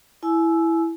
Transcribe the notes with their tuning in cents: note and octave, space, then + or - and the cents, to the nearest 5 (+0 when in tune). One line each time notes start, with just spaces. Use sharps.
E4 +5 G#5 +35 E6 +0